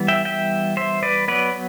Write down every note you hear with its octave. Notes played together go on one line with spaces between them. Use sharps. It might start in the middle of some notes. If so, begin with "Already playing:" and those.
Already playing: E3 G3 B3
E5 G5
E5 G5
C5 E5
B4 D5
F#3 B3 B4 D5